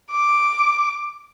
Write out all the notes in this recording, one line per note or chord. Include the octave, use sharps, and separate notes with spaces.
D6